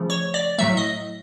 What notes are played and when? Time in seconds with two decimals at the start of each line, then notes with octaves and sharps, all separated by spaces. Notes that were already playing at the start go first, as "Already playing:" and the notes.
Already playing: C#3 F3 A3
0.10 C#5
0.34 D5
0.58 A2 F#3 A3 E5
0.77 D#5